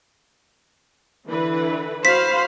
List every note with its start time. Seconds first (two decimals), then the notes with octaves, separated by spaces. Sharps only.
1.26 D3 E3 B4
2.05 F#4 C5 F5 B5 B6